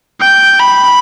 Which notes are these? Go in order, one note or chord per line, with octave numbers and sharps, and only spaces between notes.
G5
B5